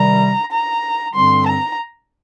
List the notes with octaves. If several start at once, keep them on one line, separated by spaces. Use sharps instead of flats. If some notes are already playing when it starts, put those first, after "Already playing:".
Already playing: C3 D#3 G3 A#5
A#5
G2 D3 G3 C4 C6
A#5